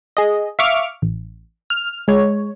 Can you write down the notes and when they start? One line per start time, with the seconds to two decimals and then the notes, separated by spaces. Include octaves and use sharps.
0.17 G#4 D#5
0.59 E5 F5 C#6 D6 F6
1.02 A1
1.70 F6
2.08 G#3 C#5